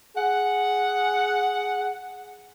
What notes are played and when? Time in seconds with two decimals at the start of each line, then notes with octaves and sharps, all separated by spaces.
0.17 G#4 F#5